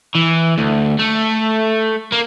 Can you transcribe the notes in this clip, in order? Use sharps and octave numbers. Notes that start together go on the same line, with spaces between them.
E3
D2
A3
A#3